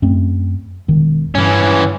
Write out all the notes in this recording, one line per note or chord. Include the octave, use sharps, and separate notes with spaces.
F#2 A3 C4
E1 D#3
G2 E3 C#4